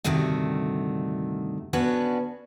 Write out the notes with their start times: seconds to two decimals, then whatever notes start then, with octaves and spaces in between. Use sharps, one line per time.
0.04 D2 G2 C3 D#3 A3 F#4
1.73 B3 C#4 D4 F#4 B4